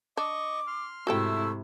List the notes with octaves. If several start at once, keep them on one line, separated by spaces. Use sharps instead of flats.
D4 D#5 C#6 D6
C6 F6
G#2 C3 A3 E4 F#4 A4 G5 E6